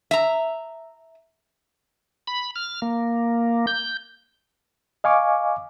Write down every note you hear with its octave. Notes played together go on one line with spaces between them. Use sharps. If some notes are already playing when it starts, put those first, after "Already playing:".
E5 A#5
B5
F6
A#3
G6
D#5 F5 G#5 C#6 D6